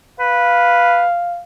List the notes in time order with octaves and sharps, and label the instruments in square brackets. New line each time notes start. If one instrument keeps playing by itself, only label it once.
[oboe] B4 [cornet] F5